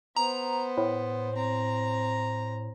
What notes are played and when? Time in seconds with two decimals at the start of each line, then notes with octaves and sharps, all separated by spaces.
0.16 B3 C5 A#5
0.77 A2
1.35 C4 A#5